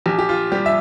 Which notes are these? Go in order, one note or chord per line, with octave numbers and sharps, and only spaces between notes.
A#1 G4
G4
F4
G3 G4
E5